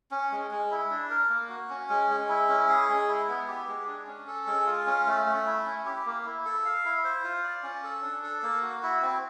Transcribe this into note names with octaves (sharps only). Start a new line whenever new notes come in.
C#4
G#3
G#3
E4
D4
A#4
A#3
F#4
C#4
G#3
G#3
E4
C#4
G#4
G#3
E4
B3
G4
G#3
D4
C#4
A4
G#3
F4
C#4
A3
A3
E4
C#4
G4
A#3
E4
A4
F5
E4
C5
F4
D5
C#4
A4
D4
A4
A#3
F#4
E4
C4